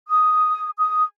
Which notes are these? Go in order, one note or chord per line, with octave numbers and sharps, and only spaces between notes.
D#6
D#6